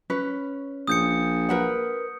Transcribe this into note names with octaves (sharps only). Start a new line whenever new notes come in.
C#4 B4
A#1 D#6 G6 C#7
A#4 B4 F#5